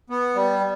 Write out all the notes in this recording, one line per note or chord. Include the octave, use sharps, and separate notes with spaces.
B3
G3